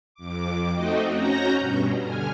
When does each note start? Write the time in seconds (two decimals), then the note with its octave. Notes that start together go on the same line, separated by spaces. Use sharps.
0.15 F2 D6
0.73 A3 C4 D#4 F#4 D#5 G5
1.06 C#4 F#4 A#5 G6 A#6
1.56 G2 B2
2.02 D3 G#5 F6